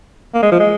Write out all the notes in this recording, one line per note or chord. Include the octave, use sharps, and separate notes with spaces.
A#3
G#3
F3
G#3